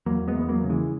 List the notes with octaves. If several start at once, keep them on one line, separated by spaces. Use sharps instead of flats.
E2 F#3 A#3
G#3 B3
E2
B3
F#3 A#3
C#3
E3 G#3